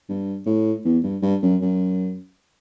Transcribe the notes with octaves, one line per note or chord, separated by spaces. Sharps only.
G2
A2
E2
G2
G2
F#2
F#2